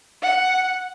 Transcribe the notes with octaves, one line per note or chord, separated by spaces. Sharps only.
F#5